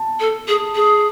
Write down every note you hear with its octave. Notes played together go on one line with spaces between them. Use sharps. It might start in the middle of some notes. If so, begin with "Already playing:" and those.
Already playing: A5
A4
G#4
G#4